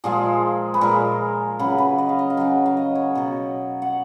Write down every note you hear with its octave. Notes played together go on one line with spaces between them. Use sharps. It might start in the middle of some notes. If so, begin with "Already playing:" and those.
A#2 F3 G#3 G#4
B4
A#2 G#3 A#4
C#3 F#3 B4
B4
D#5
F5
D#5
F5
C#3 F#3 D#5
F5
D#5
C#5
B2 F#3
F#5